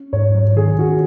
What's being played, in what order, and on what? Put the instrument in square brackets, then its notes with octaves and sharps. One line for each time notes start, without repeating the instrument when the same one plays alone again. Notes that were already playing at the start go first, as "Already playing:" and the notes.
Already playing: [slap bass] C#4
[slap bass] G#2 [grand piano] C#5
[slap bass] F#3
[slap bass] D#3 [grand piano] G#4
[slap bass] C#4 [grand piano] F#4